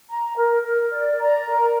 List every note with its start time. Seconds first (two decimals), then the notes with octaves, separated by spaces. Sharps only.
0.08 A#5
0.36 A#4
0.63 A#4
0.91 D5
1.19 A#5
1.47 A#4